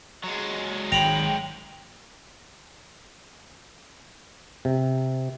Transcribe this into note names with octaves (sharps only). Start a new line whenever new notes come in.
F#3 G#3
G#1 D#3 G5 A#5 B5
C3